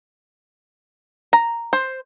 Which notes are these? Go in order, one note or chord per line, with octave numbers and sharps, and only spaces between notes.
A#5
C5